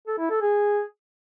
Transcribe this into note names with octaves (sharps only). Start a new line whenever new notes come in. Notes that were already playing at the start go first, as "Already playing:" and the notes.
A4
E4
A4
G#4